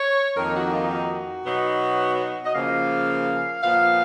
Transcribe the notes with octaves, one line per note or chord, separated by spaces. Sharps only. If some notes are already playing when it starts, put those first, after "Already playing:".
Already playing: C#5
F2 D#3 A#3 D#4 A#4
F#4
F4
F#4
B2 F#3 B3 D#4
D#5
C#3 F3 A#3 F5
A#2 F3 B3 F5